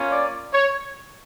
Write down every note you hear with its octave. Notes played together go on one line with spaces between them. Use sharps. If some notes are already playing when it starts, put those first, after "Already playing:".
Already playing: A#3 C#4 F4
D5
C#5